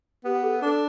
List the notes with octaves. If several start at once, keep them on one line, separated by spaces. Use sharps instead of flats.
B3 G4
A4
D4 A4